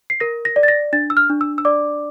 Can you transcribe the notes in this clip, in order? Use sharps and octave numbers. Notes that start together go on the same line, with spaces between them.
C7
A#4 A#6
A#6
D5
A6
A#6
D4 A6
E6
F6
D4
E6
E6
D5 D6